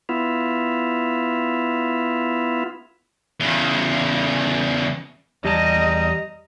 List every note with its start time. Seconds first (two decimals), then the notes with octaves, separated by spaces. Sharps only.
0.09 B3 E4 F4
3.40 E2 C#3
5.45 E2 G3 D#5 A5 A#5